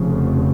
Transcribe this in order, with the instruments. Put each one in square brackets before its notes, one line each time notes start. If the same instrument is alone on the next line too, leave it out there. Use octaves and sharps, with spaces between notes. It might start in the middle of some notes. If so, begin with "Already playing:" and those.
Already playing: [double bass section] F1 F2 C#3